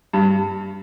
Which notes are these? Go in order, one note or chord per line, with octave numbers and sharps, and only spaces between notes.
G2